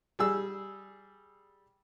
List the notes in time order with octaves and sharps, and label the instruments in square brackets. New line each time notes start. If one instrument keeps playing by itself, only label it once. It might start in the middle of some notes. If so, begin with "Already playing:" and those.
[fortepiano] G3 G#4 E6